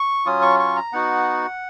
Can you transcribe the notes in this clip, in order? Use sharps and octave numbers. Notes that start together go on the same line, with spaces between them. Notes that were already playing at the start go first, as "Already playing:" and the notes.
Already playing: C#6
F#3 C#4 F4 D#6
C#6
C#6
A#5
B3 D#4 F#4 F#5